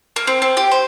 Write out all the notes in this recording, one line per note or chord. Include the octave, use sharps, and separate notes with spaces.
A#3
C4
C4
G4
C5